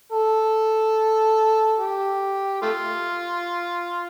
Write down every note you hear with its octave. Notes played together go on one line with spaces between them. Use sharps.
A4
G4
A3 F4